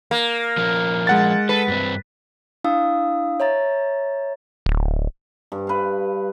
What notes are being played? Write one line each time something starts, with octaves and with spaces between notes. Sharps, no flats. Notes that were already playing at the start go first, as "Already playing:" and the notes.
A#3
F3 C#4 A#4
G#3 F#5 A6
A4 B4
G2 C4
D4 E4 F5 D#6 E6
C#5 E5 A#5 A6
D1
G2
B4 F5